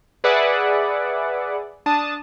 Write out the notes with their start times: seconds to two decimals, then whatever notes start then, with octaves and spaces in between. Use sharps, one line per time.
0.24 G#4 B4 D5 E5 F#5 D6
1.86 D4 A5 D#6